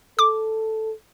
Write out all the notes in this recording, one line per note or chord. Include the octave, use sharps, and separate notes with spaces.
A4 D6